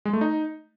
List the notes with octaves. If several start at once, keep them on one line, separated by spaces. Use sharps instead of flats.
G#3
A3
D#4